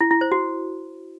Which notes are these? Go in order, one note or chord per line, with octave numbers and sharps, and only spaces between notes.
E4
E4
C5
F#4